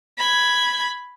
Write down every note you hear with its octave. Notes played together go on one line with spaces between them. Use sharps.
B5 G#6